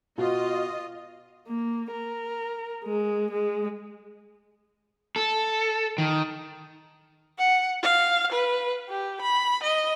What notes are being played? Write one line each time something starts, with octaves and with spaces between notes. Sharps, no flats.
B2 F4 D#5
A#3
A#4
G#3
G#3
A4
D#3
F#5
F5
B4
G4
B5
D#5